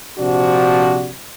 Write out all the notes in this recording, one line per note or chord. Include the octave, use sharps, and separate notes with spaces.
A#1 C3 F3 D4 F#4